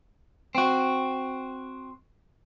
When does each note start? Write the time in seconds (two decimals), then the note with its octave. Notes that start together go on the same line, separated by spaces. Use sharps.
0.55 C4 F#4